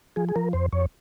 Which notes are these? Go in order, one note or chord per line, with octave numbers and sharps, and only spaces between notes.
F3 G#4
G#4
F3 A#4
F2 C5
F2 C#5